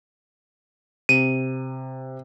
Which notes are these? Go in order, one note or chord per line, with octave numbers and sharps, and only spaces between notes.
C3 D#7